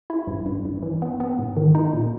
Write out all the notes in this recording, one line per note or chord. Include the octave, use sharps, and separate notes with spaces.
E4
G2
G2
G2
E3
B3
B3
G#2
D#3
D#4
A#2